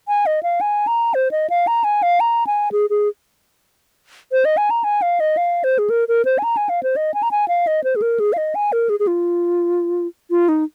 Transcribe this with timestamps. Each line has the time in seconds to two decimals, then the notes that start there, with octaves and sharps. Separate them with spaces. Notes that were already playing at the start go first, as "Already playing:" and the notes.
0.08 G#5
0.26 D#5
0.43 F5
0.61 G#5
0.87 A#5
1.14 C5
1.31 D#5
1.50 F5
1.67 A#5
1.84 G#5
2.03 F5
2.20 A#5
2.47 G#5
2.72 G#4
2.90 G#4
4.32 C5
4.45 D#5
4.57 G#5
4.70 A#5
4.84 G#5
5.02 F5
5.20 D#5
5.37 F5
5.64 C5
5.79 G#4
5.90 A#4
6.08 A#4
6.25 C5
6.38 G#5
6.44 A#5
6.57 G#5
6.69 F5
6.83 C5
6.96 D#5
7.14 G#5
7.23 A#5
7.31 G#5
7.48 F5
7.67 D#5
7.84 C5
7.96 G#4
8.02 A#4
8.20 G#4
8.33 F5
8.38 D#5
8.55 G#5
8.72 A#4
8.89 G#4
9.00 G#4
9.07 F4
10.31 F4
10.49 D#4